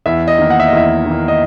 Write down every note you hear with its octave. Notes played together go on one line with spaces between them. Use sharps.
E2 E5
D#5
D#3 A#3
F#5
E5
D#5
E2 E5
D#3 A#3
D#5